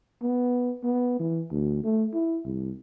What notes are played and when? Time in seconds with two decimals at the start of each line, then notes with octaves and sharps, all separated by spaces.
0.22 B3
0.84 B3
1.19 E3
1.51 D2
1.84 A3
2.13 E4
2.45 C2